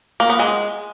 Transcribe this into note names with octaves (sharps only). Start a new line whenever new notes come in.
A#3
B3
G#3